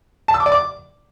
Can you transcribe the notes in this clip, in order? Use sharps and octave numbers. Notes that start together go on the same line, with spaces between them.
A5
E6
D6
D5
D6